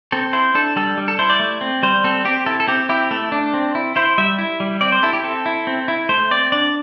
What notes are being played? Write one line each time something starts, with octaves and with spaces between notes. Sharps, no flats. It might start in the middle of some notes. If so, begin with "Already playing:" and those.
C4 A4
E4 C5
D4 A4
G3 A4
G3
A4
E4 C5
D5
A3
C4
G3 C5
C4 A4
C4 G4
E4 A4
A4
C4 G4
E4 G4
A3 A4
D4
C4
E4
E4 C5
G3 E5
E4
G3
C4 D5
C5
E4 A4
G4
C4 A4
E4
C4
E4
A3 C5
C4 D5
D4 D5